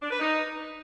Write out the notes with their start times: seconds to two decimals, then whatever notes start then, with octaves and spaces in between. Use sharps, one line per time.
0.02 D4
0.11 B4
0.20 D#4